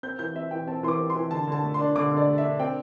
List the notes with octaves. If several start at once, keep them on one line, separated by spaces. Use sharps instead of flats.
C4 G6
E3 G6
C4 E5
E3 G5
C4 A5
E3 C6 D6
C4
C6
E3
D3 A5
D3 A5
A3
D4 C6
D3 D6
D3
D5
A3
E5
D4
C4 G5